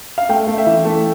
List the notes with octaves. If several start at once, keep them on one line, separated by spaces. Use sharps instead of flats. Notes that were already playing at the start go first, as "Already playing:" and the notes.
F5
A3 G5
A3 F5
E5
E3
A3